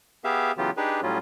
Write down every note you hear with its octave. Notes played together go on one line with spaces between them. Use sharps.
B3 G4 G#4 E5 F5
C#3 E3 F#3 B3 F4 G4
D4 D#4 G4 G#4 B4
A2 F#3 G3 C#4 F4